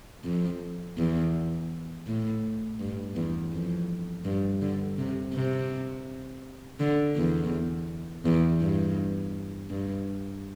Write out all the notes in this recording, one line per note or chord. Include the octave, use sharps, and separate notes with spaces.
F2
E2
A2
G2
E2
F2
G2
D3
C3
C3
D3
E2
E2
G2
G2